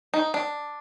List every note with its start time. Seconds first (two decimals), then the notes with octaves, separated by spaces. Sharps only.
0.14 D#4
0.34 D4